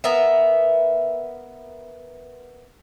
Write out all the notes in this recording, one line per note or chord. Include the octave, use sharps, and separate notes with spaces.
B3 A#4 E5